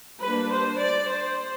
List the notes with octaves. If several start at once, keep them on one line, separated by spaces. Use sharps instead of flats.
G3 A#3 D4 B4
C5
D5
C5